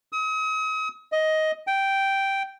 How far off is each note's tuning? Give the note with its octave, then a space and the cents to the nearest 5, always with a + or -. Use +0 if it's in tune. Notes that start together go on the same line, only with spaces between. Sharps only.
D#6 +40
D#5 +10
G5 -5